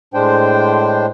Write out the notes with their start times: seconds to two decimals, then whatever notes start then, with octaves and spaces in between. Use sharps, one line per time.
0.14 A2 G#3 D4 C5 G5